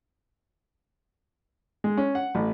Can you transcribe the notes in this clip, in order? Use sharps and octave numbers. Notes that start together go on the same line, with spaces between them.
G#3
C#4
F#5
A1